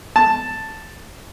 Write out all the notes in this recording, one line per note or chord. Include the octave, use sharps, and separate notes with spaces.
A5